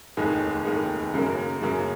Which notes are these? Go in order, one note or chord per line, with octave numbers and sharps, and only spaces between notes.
F1 D#2 D#3 G#3 D#4
F1 D#2 D#3 G#3 D#4
F#2 C#3 F#3 A#3
F#2 C#3 F#3 A#3